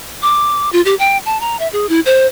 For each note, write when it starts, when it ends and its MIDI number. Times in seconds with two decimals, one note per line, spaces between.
0.22 0.69 86
0.73 0.81 65
0.85 0.95 67
0.99 1.18 79
1.26 1.40 81
1.41 1.57 82
1.59 1.68 76
1.73 1.89 68
1.89 2.00 64
2.06 2.26 72